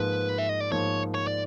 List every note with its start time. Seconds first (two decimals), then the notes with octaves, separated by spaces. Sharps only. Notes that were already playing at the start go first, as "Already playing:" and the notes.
Already playing: G#2 F3 A#3 B4
0.38 E5
0.49 D#5
0.60 D5
0.71 G#2 F3 A#3 C#5
1.14 C#5
1.27 D5